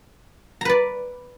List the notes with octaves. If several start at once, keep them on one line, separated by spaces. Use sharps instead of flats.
B4 D5 A#5